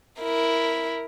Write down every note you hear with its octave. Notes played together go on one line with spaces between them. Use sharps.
E4 A#4